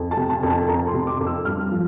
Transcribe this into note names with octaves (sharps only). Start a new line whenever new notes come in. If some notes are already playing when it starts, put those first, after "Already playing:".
Already playing: F2
A5
C3
A5
F2
A5
F2 A#5
C6
C3
D6
F2
E6
G2 F6
F3